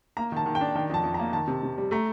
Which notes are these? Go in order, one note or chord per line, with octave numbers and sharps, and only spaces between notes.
A#3 A#5
D#3 A5
D#3
G5
D4
D#3 G5
F2 A5
F2
A#5
A#3
D#3 A5
C3
C3
G3
A3 A#5